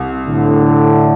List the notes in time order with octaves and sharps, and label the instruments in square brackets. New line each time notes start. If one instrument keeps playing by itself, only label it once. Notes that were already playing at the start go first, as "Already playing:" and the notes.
Already playing: [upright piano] C2
[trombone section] A2 D3